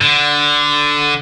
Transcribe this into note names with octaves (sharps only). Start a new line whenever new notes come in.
D3